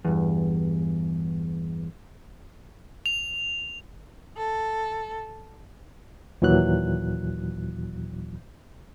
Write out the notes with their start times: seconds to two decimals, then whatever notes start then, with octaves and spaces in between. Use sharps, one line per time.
0.05 E2 G2
3.06 F7
4.36 A4
6.42 D#2 A#2 E3 F#3 F#6